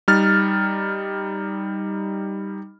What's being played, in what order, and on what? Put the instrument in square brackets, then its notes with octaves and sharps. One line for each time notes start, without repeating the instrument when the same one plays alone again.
[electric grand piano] G3 D#4 F6 A6